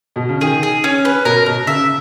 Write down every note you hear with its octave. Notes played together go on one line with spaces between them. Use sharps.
B2
C#3
D#3 G#4
G#4
C#4
B4
B2 A#4
B2 A#4
C#3 E5